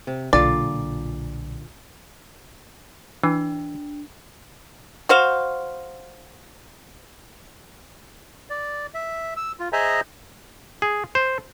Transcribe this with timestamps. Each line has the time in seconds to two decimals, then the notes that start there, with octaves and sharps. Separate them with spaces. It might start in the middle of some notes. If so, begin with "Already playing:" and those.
0.07 C3
0.33 B1 A#2 D3 F4 D5
3.24 E3 D4
5.09 F#4 C5 F5
8.50 D5
8.94 E5
9.37 E6
9.59 F4
9.73 G#4 C5 D#5 E5 G#5 A#5
10.82 G#4
11.15 C5